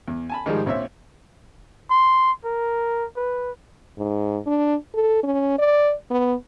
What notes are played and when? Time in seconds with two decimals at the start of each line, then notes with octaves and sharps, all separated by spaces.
0.08 E2
0.30 G#5 A5 B5
0.46 G#2 D#3 F3 G3 G#3
0.66 A#1 C4 C#5 E5
1.90 C6
2.45 A#4
3.16 B4
3.98 G#2
4.46 D4
4.94 A4
5.23 C#4
5.59 D5
6.10 B3